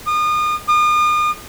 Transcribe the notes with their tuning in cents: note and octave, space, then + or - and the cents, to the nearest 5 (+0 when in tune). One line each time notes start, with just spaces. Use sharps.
D#6 -35
D#6 -40